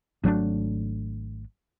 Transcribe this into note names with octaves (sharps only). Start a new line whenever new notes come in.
G#1 F#3 A3 D4